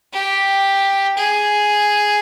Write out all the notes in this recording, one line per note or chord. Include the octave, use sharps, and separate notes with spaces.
G4
G#4